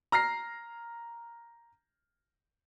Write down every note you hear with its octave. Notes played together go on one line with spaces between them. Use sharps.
A#5 F6 A#6 C7